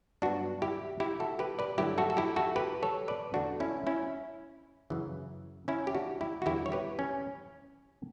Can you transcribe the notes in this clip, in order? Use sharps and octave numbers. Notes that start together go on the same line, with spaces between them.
G2 F#3 B3 D4 F#4
E4 G4
E4 G4
F#4 A4
G4 B4
B4 D5
G2 D3 F#3 A3 E4 G4
F#4 A4
A4
E4 G4
F#4 A4
G4 B4
A4 C#5
B4 D5
E2 D3 A3 D4 F#4
C#4 E4
C#4 E4
F#2 C#3 E3
C#4 E4
G4
D4 F#4
E4 G4
F#4
E2 D3 G3 B3 E4 G4
C#5
G4 B4
C#4